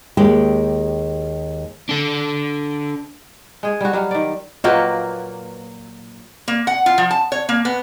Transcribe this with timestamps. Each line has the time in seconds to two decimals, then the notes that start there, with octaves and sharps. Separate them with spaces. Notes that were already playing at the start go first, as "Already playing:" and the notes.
0.17 D#2 G#3 G4
1.89 D4 A4
3.63 G#3 G#4
3.81 G3 F#4
3.93 F#3 G3 F5
4.11 D#3 D5
4.64 A#2 F#3 A#3 F4 F#4 B4 D#5 G5
6.48 A#3
6.67 F#5
6.86 F4
6.98 F3
7.11 A5
7.32 C#5
7.49 A#3
7.65 B3